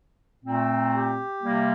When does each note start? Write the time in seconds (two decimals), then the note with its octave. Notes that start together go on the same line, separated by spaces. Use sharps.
0.44 A#2 A3 C4
0.93 G4
1.42 C3 G3 A#3